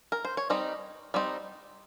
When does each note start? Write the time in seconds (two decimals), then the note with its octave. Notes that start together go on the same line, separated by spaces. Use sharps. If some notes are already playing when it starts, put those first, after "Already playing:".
0.12 A#4
0.25 C5
0.37 C#5
0.50 G3 C4 D#4 D#5
1.14 G3 C4 D#4